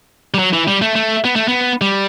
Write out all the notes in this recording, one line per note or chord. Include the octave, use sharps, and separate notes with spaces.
G3
F#3
E3
G3
A3
A3
B3
A3
B3
G3